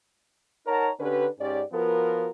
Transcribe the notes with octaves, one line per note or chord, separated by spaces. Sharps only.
D#4 A#4 C#5 F#5 A5 A#5
D3 C#4 D4 G4 B4
G#2 C#4 G4 D5
F3 B3 F4 F#4 A#4